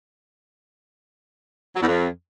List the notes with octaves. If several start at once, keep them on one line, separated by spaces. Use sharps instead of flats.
F#3
E2
F2